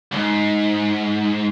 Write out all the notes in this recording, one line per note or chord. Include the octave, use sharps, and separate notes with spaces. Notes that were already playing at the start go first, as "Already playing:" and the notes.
C#2 G#2